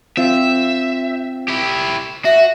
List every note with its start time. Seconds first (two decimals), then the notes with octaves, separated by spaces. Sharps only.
0.17 C4 F4 E5
1.48 E4 G4
2.25 F#4 E5